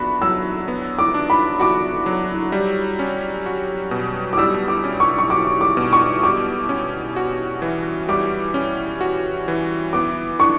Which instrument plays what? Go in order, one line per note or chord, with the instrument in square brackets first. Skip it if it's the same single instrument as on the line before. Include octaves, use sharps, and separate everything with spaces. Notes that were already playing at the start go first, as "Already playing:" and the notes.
Already playing: [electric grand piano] B3 D4 F#4 [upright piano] B5
[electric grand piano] F#3 [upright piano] E6
[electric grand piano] B3
[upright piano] D6
[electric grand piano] D4
[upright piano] B5
[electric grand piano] F#4 [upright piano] D6
[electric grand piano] F#3
G3
C#4
F#4
B2
[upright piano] D6
[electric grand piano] G3 [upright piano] E6
[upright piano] D6
[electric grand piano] C#4
[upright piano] C#6
C#6
[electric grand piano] F#4 [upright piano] D6
[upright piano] D6
[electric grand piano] B2
[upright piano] C#6
[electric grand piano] G3 [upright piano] D6
[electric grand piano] C#4
F#4
E3
[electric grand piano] G3 [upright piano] D6
[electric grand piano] C#4
F#4
E3
[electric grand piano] B3 [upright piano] D6
[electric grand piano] D4 [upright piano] C#6